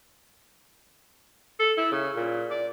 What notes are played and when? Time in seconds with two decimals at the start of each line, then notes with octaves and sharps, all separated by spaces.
1.59 A4
1.77 E4
1.91 C#3
2.15 A#2
2.51 D5